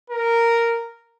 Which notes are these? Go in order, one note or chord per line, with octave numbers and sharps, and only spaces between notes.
A#4